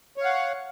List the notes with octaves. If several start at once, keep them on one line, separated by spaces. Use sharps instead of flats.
C#5 F5 F#5